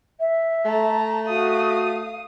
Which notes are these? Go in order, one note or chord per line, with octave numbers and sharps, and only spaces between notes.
E5
A3 A5 A#5
F#4 F5 D#6